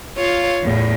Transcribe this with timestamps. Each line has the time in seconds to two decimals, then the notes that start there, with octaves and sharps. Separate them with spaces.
0.17 F4 C#5 F5
0.62 E2 A2